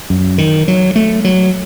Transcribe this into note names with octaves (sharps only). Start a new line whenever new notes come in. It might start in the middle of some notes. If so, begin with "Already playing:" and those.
F#2
D#3
F#3
A3
F#3